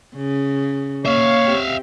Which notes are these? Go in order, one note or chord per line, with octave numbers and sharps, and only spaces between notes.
C#3
A#3 C#5 E5 F5
C4 G4